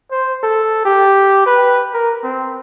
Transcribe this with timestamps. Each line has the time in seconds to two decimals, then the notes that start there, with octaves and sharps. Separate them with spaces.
0.12 C5
0.43 A4
0.85 G4
1.47 B4
1.94 A#4
2.23 C4